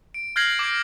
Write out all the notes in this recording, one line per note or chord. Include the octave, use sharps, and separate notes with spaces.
D7
F6 G6 G#6 A#6 C7 F#7
D6 G#6 D7